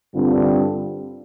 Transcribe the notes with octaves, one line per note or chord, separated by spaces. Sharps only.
G2 D3 G3 C4 F4